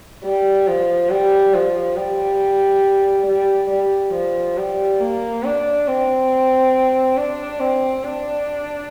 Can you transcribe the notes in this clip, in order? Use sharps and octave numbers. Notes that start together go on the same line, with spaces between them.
G3
F3
G3
F3
G3
G3
G3
F3
G3
A#3
D4
C4
D4
C4
D4